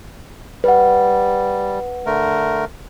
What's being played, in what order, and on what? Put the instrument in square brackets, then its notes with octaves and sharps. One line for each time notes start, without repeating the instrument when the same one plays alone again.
[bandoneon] G3 [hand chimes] B4 F#5
[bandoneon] D3 A3 A#4